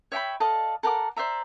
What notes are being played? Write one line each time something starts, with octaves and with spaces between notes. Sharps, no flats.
C#5 E5 G5 B5
A4 D5 D#5 F5
A4 A#4 F#5 D6
C5 D5 E5 A#5